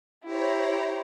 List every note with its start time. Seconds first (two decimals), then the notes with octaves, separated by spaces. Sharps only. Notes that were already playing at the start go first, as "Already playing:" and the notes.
0.25 E4 G4 C5 C#5 A#5